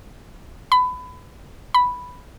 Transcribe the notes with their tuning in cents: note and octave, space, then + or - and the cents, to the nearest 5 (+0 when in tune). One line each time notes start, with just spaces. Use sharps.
B5 +25
B5 +0